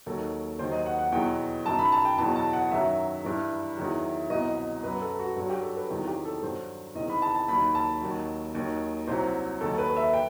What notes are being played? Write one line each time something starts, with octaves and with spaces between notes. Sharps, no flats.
D#2 D#3 F#3 A4
D#2 D#3 F#3 C5
D#5
F#5
F#5
E2 B2 F#3 G5
F#2 D#3 F#3 A5
B5
A5
G5
E2 B2 F#3 A5
A5
F#5
F#2 D#3 F#3 E5
G2 E3
E2 D#3 F#3
C2 B2 F#3 D#5
F#2 F#3 B4
A4
F#4
G2 F#3 F#4
G4
A4
B4
E2 C3 D#3 F#3
G4
A4
G2 F#3 C5
E2 C3 D#3 D#5
B5
A5
A5
D#2 D#3 F#3 B5
A5
D#2 D#3 F#3
D#2 D#3 F#3
C2 C3 F#3 C5
D#2 D#3 F#3 A4
B4
E5
G5